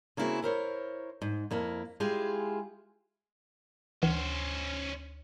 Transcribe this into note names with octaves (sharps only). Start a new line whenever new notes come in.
C#3 A#3 C4 E4 F#4 G#4
E4 A#4 C5 C#5
G#2
F2 A#3 E4
G#3 E4 F4 G4 G#4
D2 E3 C#4 C5